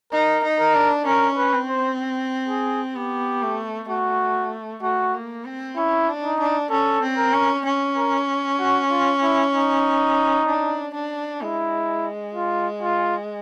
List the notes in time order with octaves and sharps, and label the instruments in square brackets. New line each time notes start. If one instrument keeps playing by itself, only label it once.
[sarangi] D#4 [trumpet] A#4
[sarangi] D#4
[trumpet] A#4
[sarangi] D4
[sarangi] C#4 [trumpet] A#4
[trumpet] B4
[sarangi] C4
[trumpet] C5
G#4
[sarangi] B3 [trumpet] G4
[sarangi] A3
[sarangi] A3 [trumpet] F#4
[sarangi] A3 [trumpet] F#4
[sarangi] A#3
C4
[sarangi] C#4 [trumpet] E4
[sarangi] D4
[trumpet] D#4
[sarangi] D4
[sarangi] C#4 [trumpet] A4
[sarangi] C4
[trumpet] A#4
[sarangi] C#4
C#4
[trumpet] A#4
F#4
F4
E4
D#4
[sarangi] D4
D4
[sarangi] G#3 [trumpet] E4
[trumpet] F4
F4